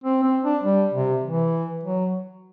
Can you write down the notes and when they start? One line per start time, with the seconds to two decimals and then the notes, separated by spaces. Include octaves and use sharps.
0.04 C4
0.23 C4
0.44 D4
0.63 G3
0.93 C3
1.24 E3
1.84 F#3